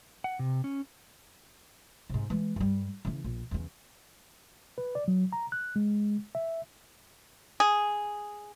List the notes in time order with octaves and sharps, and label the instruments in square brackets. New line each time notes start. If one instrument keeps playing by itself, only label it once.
[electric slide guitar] F#5
C3
C#4
[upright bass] G#2 C3
E3 G#3
G2 G3
C#3 E3
A#1
E2 C#3
[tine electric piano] B4
D5
F#3
A#5
F#6
G#3
E5
[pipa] G#4